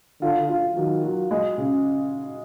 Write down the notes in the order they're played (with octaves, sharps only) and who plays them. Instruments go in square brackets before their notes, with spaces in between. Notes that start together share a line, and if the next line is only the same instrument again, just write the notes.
[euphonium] D3 [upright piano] F4
[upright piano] F4
[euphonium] D#3 [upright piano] F#3
[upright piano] F#3
G#3
C#3